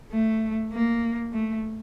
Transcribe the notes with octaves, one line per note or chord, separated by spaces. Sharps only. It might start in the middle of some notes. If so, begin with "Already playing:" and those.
A3
A#3
A3